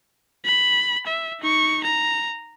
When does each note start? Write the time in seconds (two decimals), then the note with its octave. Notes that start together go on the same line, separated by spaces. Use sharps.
0.45 B5
1.06 E5
1.41 D#4 C#6
1.83 A#5